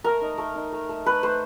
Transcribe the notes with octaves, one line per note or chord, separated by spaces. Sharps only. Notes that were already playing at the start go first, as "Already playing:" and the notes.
A3 A#4
D#4
A3
D#4
A3
A3
A3 B4
A3 C5